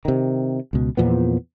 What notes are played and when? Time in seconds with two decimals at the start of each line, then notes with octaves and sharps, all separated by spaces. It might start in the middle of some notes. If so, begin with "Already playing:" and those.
0.05 C3 D#3
0.73 C#2 B2
0.97 E2 A#2 F3 B3